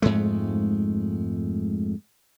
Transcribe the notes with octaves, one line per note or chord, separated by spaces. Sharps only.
F2 G#2 G#3 A3